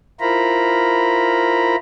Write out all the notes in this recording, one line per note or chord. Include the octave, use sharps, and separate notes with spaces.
E4 F4 A#4 C5 A#5 B5